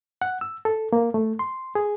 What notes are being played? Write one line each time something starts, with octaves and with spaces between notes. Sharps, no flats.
F#5
E6
A4
A#3
A3
C6
G#4